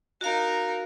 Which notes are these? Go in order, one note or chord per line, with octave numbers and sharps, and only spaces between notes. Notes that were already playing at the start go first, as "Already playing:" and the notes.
D#4 F#4 A#4 F5